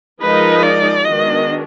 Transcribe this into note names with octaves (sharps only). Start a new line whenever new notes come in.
F3 G#3 D#4 A#4 B4 D#5
D5
D#3 G#3 B3 D4 F#4 D#5